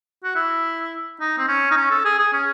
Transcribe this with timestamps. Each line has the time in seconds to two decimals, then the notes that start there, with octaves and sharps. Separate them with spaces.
0.24 F#4
0.36 E4
1.21 D#4
1.38 C4
1.49 C#4
1.71 D#4
1.77 C#4
1.91 A4
2.05 G#4
2.19 G#4
2.33 C#4